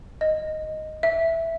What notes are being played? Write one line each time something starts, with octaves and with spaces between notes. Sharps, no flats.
D#5
E5